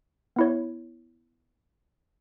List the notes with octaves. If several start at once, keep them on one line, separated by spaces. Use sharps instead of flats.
B3 E4 C#5